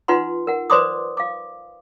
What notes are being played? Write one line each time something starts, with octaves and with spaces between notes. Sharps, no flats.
D#4 F4 B4 F#5 C6
A#4 F#5
B4 C5 D5 C6 D6 D#6
F5 D6